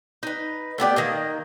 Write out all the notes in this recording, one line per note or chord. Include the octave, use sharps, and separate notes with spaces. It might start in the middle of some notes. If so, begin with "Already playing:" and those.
D#4 B4
A3 B3 G4 D5
D#3 A#3 D#5